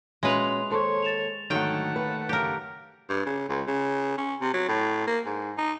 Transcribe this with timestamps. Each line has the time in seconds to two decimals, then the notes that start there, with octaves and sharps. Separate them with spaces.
0.23 A#2 G#3 C#4 F#4 B4 E5 C6 F7
0.70 D#2 A4 C5 C#5 C6 C#6
1.02 A6 E7 F7
1.50 G#2 D3 D#3 F#3 A3 F#5 G5
1.96 D#2 B4
2.29 F#2 C#3 G4 A#4
3.10 G2
3.26 C#3
3.49 C#2
3.67 C#3
4.18 C#4
4.41 C3
4.54 F#3
4.69 A2
5.07 A#3
5.26 G#2
5.58 D#4